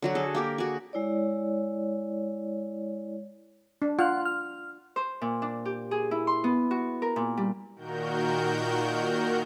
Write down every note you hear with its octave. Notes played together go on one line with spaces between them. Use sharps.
D3 F#3 F#4
G#4 A4
A#3 G4 A#4
F#4 G#4
G#3 E4 C#5 D5
D4
F4 F#5 F6 F#6
F6
C5
A#2
D4
G4
G#4
E4
C6
B3
F#4
A#4
A#2
G3
A#2 D#3 F#4 A#4 G6